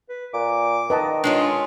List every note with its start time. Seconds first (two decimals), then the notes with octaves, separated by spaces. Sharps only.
0.09 B4
0.34 A#2 D6
0.90 D#3 B4 D#5 A5
1.24 G#3 C#4 D4 F4